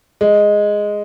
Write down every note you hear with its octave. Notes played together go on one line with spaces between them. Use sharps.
G#3